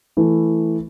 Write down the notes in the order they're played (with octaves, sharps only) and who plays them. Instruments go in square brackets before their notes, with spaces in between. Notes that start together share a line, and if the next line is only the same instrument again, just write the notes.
[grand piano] E3 A3 E4